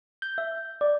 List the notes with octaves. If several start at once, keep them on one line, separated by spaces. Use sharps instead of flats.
G6
E5
D5